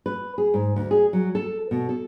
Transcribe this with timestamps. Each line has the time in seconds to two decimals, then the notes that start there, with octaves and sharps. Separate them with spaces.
0.06 B4
0.38 G#4
0.54 G#2
0.76 D2
0.91 G#4
1.13 F#3
1.35 A4
1.71 B2
1.89 A4